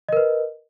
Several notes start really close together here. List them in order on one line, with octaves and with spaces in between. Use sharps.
D#5 A#4 B4